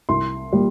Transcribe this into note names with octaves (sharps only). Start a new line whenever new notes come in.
C2 C6
A#2 G3